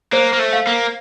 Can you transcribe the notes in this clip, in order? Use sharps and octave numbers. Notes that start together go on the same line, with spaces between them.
A#3 C5
A#3
A3
F5
A#3